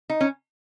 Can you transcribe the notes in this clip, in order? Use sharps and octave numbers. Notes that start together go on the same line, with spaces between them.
D#4
C#4